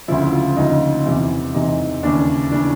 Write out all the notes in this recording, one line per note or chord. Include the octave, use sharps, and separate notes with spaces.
D2 C#3 F3 E4
F4
D2 C#3 F3 D#4
E2 C3 E3
E2 C3 E3 D#4
D#2 C#3 E3 D4
C#3 E3 D4